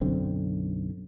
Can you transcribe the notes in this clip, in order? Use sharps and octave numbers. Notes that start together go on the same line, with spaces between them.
B1 F#2 D3 C4